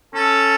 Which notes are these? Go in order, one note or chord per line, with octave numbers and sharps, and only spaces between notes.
C#4 A4